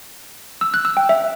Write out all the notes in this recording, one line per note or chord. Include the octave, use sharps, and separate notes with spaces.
E6
F#6
E6
G5
E5